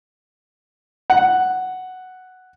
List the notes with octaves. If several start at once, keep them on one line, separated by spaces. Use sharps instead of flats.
F#5